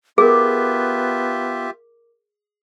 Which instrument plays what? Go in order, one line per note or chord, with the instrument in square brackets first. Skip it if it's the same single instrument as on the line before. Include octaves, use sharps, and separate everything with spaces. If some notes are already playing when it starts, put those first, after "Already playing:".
[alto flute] B3 [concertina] F4 G4 E5 [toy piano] G#4 [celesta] A#4 D6